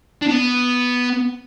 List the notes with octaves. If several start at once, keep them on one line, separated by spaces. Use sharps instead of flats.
D4
B3